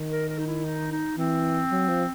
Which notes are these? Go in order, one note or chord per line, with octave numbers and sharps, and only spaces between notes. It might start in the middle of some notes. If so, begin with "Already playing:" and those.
Already playing: D#3
A#4
A#4
D#4
E4
D#4
D#4
E3 C4
F#3
F3